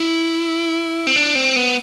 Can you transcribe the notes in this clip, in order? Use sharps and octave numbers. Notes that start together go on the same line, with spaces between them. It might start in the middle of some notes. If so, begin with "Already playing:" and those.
Already playing: E4
C4
D4
C4
B3